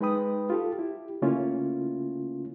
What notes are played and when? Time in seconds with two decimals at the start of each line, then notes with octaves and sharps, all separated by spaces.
0.01 G#3 D#4 B4 G5 B5 D#6
0.50 F4 G4 A4
0.79 E4 G4
1.22 C#3 A3 A#3 C#4 E4 F4